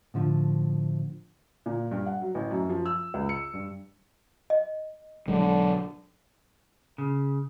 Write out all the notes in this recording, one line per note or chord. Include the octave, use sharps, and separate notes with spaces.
A2 D3 F3
A#2
G2
F#5
F#3
A1
F#2
F3
E6
C#2
C#7
G2
D#5
B1 D3 F#3 G#3
C#3